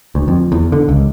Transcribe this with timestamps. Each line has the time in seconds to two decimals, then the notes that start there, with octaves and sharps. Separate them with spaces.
0.15 D2
0.28 F2
0.52 E2
0.72 D3
0.89 C#2